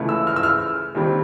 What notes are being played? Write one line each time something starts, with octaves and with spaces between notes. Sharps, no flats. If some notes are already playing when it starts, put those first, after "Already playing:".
Already playing: C#2 C#3 E3 A3
E6
F6
E6
F6
D#2 D#3 G3 C4